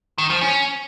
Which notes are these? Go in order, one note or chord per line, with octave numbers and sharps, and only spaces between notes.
D#3
F3
C#4